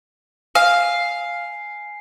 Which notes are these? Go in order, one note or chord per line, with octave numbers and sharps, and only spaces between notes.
F5 G#5 C7